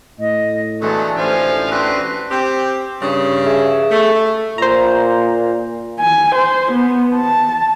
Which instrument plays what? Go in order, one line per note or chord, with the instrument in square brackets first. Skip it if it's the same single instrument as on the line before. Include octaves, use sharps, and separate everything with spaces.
[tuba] A2 [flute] D#5
[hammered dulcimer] D3 E3 G#3 [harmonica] F#3 A3 B3 [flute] A4
[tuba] A1 [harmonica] F3 F5 G#5 [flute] C5
[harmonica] C4 B4 [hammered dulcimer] D4 F#4 [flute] C6
[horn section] C4 G4
G2 C#3
[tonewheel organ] G#4 E5
[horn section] A3
[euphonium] A#2 [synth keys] C5 A#5
[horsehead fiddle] G#5
C5
B3
A5